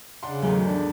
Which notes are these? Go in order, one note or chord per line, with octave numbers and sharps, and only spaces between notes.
C#3 D4 F#5 C6
E2 G#2 D#3 F#3 A3
D4